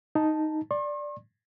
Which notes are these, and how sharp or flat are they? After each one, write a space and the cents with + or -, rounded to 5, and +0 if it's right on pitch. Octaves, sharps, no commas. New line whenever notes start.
D#4 +0 A5 +0
D5 +0 C6 +45